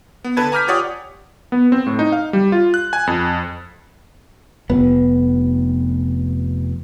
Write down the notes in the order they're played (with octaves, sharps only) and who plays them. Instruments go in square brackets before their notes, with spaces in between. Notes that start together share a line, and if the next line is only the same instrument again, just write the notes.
[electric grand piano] B3
D3 A4 B4 A5 G#6
G#5 A#5 D6 F6 G6 B6
F4 G4 C#5 D5 F#5 D#6
B3
C4
A2
D#4
F5
G3
F4
F#6
G#5
F2
[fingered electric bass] F1 B3